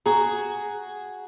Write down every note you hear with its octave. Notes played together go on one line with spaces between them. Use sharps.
F#4 G#4 A#5